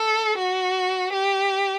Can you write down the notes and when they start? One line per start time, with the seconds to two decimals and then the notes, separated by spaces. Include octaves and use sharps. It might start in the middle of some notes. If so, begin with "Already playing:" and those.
Already playing: A4
0.37 F#4
1.13 G4